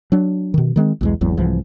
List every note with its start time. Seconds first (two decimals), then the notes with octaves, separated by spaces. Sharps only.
0.12 F#3 D4
0.54 B2 D#3
0.76 D#3 G#3 A#3 C4
1.01 B1 E2 G#3
1.21 G#1 E2 F#3
1.37 C2 G#2 E3 F3